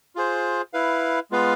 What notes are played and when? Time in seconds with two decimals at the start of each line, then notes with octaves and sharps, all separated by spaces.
0.15 F4 G#4 C5
0.73 E4 B4 F5
1.31 G#3 B3 F4 B4 F5